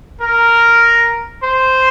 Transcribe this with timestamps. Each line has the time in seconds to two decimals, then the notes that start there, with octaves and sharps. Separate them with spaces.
0.21 A#4
1.43 C5